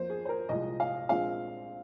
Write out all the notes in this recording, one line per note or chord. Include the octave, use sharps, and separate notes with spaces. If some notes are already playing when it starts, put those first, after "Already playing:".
Already playing: F2 F3 A#3 C5
G#4
C5
A#4
C2 A#2 F3 G#3 D#5
F5
A#1 A#2 G#3 C4 F5